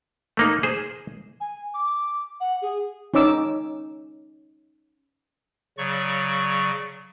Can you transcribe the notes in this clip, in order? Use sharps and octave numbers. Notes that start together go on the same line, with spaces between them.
A3 A#3 D#4
G#4 C5
G#5
D6
F#5
G#4
C#4 D#4 C#5 D6 E6
C#3 F#3 D5 C#6